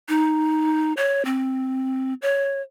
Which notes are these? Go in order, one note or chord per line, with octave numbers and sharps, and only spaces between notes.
D#4
C#5
C4
C#5